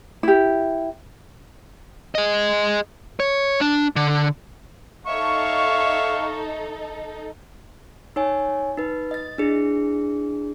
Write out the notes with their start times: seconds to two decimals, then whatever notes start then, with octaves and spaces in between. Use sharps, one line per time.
0.23 E4 G4
2.15 G#4 D#5
3.20 C#5
3.61 D4
3.96 D3
5.06 D#4 A4 C#5 E5 F5 C#6
8.16 D#4 C#5 G#5
8.77 D#4 B4
9.11 D#5 A6
9.38 D4 E4 G#4